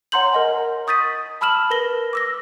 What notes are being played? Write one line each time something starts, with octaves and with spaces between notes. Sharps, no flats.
C#5 F#5 A#5 C6 G6 F#7
A#4 D#5 G#5
C#6 D#6 G6 A6 B6 D#7
A5 B5 E6 F6 E7 F#7
A#4 B4 A#6 G7
D6 E6 A#6